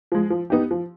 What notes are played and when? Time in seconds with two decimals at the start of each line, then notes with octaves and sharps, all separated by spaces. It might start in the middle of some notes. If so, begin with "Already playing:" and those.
0.12 F3 G#3
0.30 F3
0.50 B3 D#4 G4
0.71 F3